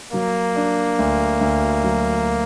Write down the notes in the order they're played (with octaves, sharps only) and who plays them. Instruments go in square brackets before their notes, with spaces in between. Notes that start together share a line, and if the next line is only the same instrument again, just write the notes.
[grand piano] F#3 [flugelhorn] A#3
[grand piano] D4
D2
D2
F#3